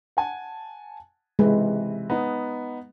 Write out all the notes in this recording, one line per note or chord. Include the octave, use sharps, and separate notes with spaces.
F#5 G#5 A5
C3 E3 G#3 B4
B3 D#4